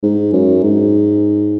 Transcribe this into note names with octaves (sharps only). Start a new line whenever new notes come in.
G#2
F#2
G#2